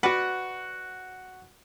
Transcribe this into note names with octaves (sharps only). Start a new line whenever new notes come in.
F#4 B4 D5 F#5